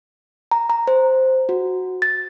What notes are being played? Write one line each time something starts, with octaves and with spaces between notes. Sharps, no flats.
A#5
A#5
C5
F#4
A6